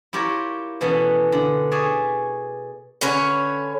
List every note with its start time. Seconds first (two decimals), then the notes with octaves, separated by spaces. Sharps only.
0.13 E4 F4 G4 A#4 C#5
0.81 B2 E3 A3 B3 C#4
1.32 D3
1.71 G#4 C#5 D5 E5
3.01 D3 C#4 B4 C#5